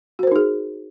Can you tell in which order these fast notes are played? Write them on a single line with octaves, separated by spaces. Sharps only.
F#4 C5 A#4 D#4 G#4